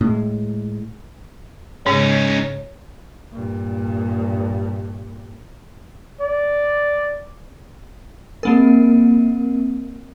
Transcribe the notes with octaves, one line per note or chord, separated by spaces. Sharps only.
A2 G#3
G#2 C#3 G#3 C#4 D#4 C#5
G2 A#2
D5
A#3 C4 A#4